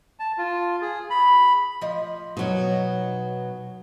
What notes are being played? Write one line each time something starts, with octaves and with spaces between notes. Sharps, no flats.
A5
F4
G#4
B5
F3 D#5
B2 F#3 D#4 C#5